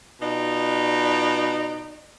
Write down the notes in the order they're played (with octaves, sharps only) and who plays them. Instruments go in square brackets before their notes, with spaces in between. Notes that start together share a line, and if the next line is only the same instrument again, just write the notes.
[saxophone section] B2 D#4 F4 D5